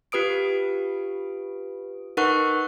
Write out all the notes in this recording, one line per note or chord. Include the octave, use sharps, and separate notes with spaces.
F4 G4 B4 D#6 D7
D#4 A#4 B4 F#5 C#6 F#6